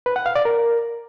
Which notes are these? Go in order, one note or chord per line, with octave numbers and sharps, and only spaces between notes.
B4
F#5
F5
D5
A#4